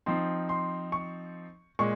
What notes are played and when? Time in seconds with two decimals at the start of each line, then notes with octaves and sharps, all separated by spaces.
0.06 F3 C4 D#4 C6
0.49 C6
0.92 C#6
1.79 A#2 G#3 C#6